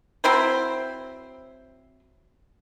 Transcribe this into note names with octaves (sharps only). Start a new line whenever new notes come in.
F#3 C4 E4 C5